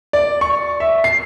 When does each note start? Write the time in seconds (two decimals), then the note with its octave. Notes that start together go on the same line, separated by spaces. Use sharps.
0.13 D5
0.41 C#6
0.80 E5
1.04 C7